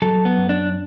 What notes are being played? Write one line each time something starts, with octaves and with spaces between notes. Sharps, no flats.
F#3 A4
B3
F#2
D4